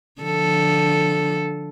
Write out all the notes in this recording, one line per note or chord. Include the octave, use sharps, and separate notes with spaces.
D3 F3 A4